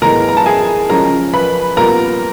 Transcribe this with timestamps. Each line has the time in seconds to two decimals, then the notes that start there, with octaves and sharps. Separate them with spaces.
0.02 A2 E3 G#3 B3 A#4 A#5
0.29 A#5
0.37 A5
0.46 G#4 G#5
0.89 C#3 F3 G#3 C#4 A#4 A#5
1.34 B4 B5
1.76 A#2 G3 B3 A#4 A#5